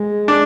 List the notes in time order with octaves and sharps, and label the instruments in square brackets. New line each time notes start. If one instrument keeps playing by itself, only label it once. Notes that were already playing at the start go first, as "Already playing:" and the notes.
Already playing: [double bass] G#3
[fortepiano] D4